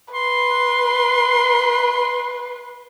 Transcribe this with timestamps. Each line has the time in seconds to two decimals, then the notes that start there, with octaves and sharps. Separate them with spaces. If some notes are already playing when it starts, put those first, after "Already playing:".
0.14 B4 C6